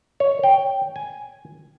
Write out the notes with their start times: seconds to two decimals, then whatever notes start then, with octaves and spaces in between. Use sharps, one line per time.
0.20 C#5
0.44 G5
0.96 G#5